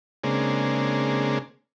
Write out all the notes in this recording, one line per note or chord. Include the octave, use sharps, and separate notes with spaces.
C#3 G#3 A#3 C4 D4